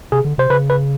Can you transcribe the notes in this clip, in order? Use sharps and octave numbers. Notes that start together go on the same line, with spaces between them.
C3 G#4
D3
C3 C5
C#3 B4
B4